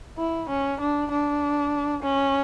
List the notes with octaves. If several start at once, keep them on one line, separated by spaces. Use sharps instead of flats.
E4
C#4
D4
D4
C#4